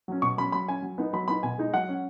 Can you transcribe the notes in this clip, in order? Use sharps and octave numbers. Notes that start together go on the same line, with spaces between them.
F#3 C#4
B2 C#6
F#3 C#4 B5
F#3 B5
C#4 G#5
F#3
B3 D#4
F#3 B5
B3 D#4 B5
B2 G#5
G#3 D#4
F#3 F#5
C#4